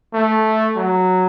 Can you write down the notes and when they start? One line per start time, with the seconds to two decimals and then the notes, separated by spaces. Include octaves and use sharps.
0.14 A3
0.76 F#3